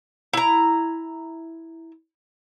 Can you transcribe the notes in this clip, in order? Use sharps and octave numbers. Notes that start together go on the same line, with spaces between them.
E4 A#5